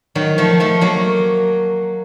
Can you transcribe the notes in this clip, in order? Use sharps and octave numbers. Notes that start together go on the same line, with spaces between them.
D#3 F#3
F3 A3
F3 A3
F#3 A#3